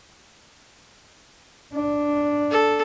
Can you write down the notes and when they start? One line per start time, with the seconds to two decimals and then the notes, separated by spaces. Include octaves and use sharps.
1.74 D4
2.50 A4